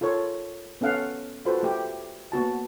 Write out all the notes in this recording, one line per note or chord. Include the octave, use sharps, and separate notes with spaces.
F4 A4 A#4 C#5
B3 C#4 A4 F5 F#5
F4 F#4 A4 B4 C5
A3 G4
A#3 B3 F#4 A5